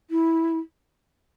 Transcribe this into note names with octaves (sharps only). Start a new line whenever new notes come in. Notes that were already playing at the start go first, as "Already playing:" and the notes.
E4